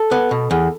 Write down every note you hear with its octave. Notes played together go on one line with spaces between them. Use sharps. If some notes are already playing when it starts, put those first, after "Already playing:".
Already playing: A4
B3
B2
E2